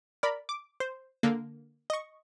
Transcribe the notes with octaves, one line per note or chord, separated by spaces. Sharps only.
A#4 D5 B5
D6
C5
D3 A#3
D#5 C#6